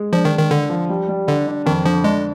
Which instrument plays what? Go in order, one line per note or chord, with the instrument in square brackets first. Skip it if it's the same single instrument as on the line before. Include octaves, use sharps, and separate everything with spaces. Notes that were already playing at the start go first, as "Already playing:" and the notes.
Already playing: [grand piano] G#3
[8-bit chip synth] F3 [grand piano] D4
[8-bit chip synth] D#3
[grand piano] D4
[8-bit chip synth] D#3
[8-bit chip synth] D3 [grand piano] D4
[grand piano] F3
G3
G3
[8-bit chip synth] D3 [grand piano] D4
[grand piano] D4
[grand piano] F2 [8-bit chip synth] D#3
[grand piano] D3 [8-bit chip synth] F3
[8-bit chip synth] G#3 [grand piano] D4